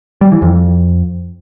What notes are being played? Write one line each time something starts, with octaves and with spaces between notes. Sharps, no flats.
G3
E3
F2